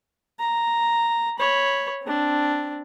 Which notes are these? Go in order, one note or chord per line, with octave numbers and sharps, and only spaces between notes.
A#5
C#5 B5
C4 D4